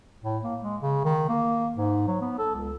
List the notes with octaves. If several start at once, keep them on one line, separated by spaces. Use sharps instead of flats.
A2
A#3
G#3
C#3
D#3
A#3
G#2
F#3
B3
A4
C#2